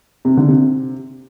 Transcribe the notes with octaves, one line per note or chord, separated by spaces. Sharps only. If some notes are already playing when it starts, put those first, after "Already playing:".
C3
D3
C3